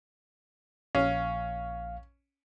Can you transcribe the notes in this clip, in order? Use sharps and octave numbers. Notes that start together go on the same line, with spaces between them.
A#1 C#4 F5